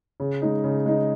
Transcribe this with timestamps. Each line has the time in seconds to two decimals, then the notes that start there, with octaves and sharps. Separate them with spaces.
0.20 C#3
0.42 G#3 D#4
0.64 C#3
0.86 G#3 D#4